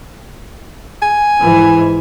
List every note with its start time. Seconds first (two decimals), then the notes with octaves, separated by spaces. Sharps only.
1.02 G#5
1.40 G#2 E3